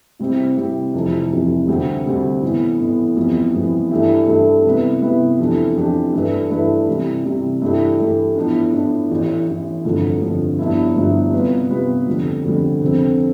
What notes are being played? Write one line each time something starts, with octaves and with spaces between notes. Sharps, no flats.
C3 G3 C4 E4 G4
C3 G3 C4 E4 G4
F1 F2 C3 E3
F1 F2 C3 E3
D2 C3 G3 C4 G4
D2 C3 G3 C4 G4
A2 E3 B3
A2 E3 B3
F2 E3 G3 B3
F2 E3 G3 B3
G2 E3 A3 E4 G4
G2 E3 A3 E4 G4
C3 G3 B3 E4 B4
C3 G3 B3 E4 B4
F2 E3 A3 D4 G4
F2 E3 A3 D4 G4
G2 E3 A3 E4 B4
G2 E3 A3 E4 B4
C3 E3 G3
C3 E3 G3
G2 E3 A3 E4 G4
G2 E3 A3 E4 G4
A2 F3 B3 D4
A2 F3 B3 D4
A1 A2 E3
A1 A2 E3
G1 F2 D3 F3
G1 F2 D3 F3
G1 G2 F3 B3 E4
G1 G2 F3 B3 E4
C3 G3 B3 F4 B4
C3 G3 B3 F4 B4
F2 D3 G3
F2 D3 G3
F2 D3 F3 C4